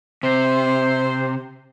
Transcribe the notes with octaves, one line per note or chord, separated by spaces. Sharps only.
C3 C5